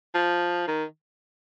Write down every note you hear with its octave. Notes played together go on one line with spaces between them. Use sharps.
F3
D#3